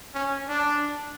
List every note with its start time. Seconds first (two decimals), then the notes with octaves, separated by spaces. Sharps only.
0.15 C#4
0.49 D4